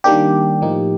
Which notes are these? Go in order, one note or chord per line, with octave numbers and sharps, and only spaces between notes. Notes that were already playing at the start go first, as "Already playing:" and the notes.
D#3 G3 A#3 D4 G4
A2 F3 A#3 D#4